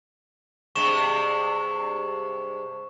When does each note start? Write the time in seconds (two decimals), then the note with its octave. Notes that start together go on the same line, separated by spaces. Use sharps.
0.75 G2 C3 G#3 C#6 E7